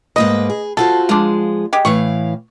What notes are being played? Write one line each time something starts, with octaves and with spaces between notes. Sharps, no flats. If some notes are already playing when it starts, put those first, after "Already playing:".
G#2 A#3 B4 D#5
G#4
F4 F#4 A4 C5
F3 G#3 D4 F4
G#3 G4
A2 E3 F5 C#6